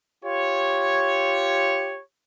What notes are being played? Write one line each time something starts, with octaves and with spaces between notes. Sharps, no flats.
F4 G4 C#5